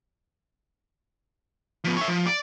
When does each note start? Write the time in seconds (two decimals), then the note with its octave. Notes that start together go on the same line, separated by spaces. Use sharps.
1.84 F3 B3
1.97 C#5 E5
2.08 F3
2.26 D5